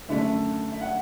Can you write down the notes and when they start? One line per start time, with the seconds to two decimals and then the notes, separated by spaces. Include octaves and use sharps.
0.09 F#2 D3 A3 E5
0.72 E5
0.81 F#5